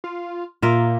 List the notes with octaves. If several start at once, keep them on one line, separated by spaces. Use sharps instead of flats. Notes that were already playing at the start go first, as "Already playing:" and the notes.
F4
A#2 A#3 F4 E5